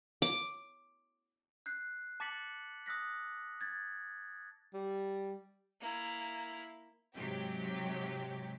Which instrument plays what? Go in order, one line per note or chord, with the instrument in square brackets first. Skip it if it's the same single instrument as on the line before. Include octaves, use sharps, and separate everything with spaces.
[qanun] D6
[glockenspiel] F#6 G6 C7
A5 D6 A6 B6 C#7 F#7
D#6 E6 F#6 A#6 B6
G#6 A6
[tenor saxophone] G3
[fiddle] A#3 E4
[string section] G#2 C3 F#3 G4